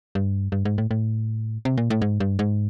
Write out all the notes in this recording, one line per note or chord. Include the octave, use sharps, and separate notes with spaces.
G2
G2
G#2
A2
A2
C3
A#2
A2
G#2
G2
G#2